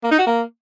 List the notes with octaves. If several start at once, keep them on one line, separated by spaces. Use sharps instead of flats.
A#3
D#4
F#4
A#3